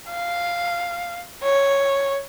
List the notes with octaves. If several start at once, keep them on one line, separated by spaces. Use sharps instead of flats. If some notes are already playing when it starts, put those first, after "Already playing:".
F5
C#5